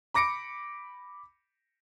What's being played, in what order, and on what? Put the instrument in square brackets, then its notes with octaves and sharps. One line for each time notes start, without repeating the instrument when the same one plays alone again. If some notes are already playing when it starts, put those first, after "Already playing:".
[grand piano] B5 D6 A#6 C#7 D7